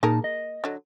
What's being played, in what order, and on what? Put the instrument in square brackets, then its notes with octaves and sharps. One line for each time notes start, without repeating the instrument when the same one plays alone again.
[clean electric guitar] A#2 D#4 A5 [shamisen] A#3 G#4 A#4
[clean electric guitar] D#5
[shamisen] D3 F#3